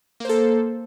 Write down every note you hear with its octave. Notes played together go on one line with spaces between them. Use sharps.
A#3 A4 C5